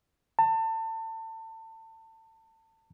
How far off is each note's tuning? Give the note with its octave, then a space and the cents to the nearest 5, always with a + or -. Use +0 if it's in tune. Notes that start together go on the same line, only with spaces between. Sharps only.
A5 +30